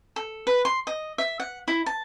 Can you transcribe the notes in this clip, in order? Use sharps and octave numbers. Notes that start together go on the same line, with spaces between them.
A4
B4
C6
D#5
E5
F#5
E4
A5